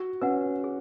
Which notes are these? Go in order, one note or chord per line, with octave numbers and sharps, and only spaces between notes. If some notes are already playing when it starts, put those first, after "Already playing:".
Already playing: F#4
C#4 B4 F#5
G#4